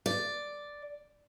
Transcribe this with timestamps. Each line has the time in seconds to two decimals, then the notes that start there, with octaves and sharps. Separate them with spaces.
0.06 D5